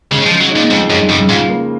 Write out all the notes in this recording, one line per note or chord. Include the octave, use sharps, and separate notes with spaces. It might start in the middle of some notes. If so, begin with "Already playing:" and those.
C#3 G#3
F3
C#3
F#3
A#2 D#4
F2 G#2
F#2 G#3
F#2 C#3
G#2 F4
A#3